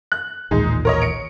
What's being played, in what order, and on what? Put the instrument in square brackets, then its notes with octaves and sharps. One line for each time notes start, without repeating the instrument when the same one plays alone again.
[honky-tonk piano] F#6
[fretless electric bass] A1 D#2 A#2 [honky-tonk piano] G#3 D#4
[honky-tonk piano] A#4 C#5 D#5
C#7 D7